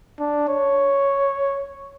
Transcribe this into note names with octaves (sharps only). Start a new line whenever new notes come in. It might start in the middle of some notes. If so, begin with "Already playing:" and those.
D4
C#5